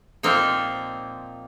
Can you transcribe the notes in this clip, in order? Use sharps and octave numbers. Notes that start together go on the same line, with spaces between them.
A#2 F3 A#3 C4 D#4